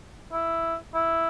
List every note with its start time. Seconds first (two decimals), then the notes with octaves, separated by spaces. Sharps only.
0.32 E4
0.94 E4